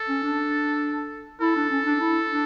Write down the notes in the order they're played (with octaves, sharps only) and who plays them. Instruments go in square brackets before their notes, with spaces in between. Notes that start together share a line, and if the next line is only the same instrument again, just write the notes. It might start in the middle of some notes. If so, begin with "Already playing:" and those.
Already playing: [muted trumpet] A4
[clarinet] C#4
D4
[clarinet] E4 [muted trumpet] A4
[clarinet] D4
C#4
D4
E4
D4